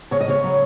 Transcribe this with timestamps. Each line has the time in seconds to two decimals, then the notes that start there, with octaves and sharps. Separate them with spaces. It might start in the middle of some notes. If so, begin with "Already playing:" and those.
0.11 C#3 C#5
0.21 D#5
0.28 C#3 C#5
0.44 F#3